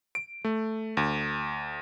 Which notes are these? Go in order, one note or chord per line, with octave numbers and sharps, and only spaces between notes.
D7
A3
D2